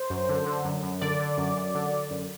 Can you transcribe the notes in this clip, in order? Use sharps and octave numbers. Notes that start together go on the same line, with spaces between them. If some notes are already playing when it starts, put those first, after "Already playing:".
Already playing: C5
F#2
D3
D3
F#2
F#2
D3 D5
D3
F#2
F#2
D3
D3
F#2